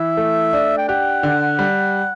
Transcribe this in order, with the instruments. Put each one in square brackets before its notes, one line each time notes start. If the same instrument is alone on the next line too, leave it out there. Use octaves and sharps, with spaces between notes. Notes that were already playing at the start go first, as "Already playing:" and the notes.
Already playing: [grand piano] E3 [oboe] E5
[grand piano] A3
D4
[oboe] G5
[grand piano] G4 [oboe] F#5
[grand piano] D3
G3